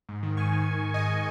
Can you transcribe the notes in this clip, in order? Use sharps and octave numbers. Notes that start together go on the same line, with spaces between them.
G#2
D#3
G#2 G#5 C#6
D#3
G#2
D#3
G#2 D#5 G#5
D#3